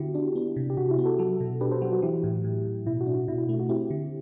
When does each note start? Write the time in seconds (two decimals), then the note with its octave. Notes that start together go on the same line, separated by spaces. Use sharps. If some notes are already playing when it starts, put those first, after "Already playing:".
Already playing: D3 B3 E4 F#4 G4
0.15 D4
0.36 B3
0.56 C3
0.70 G4
0.77 C3 F#4
0.91 E4
0.98 B3
1.05 F#4 A4
1.19 F#3 F#4 A4
1.40 B2
1.61 D4 G4 B4
1.71 A4 C5
1.82 F#3 F#4
1.93 F#4
2.02 E3 E4 G4
2.24 A2
2.44 A2
2.65 A2
2.86 B2 E4
3.01 F#4
3.07 D4
3.14 F#4
3.28 B2 E4
3.38 E4
3.49 A3 E4
3.60 F#4
3.69 C4 E4 G4
3.90 D3